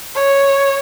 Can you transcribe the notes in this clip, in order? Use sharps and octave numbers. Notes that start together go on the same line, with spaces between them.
C#5